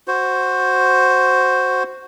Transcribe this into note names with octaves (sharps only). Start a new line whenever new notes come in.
F#4 C5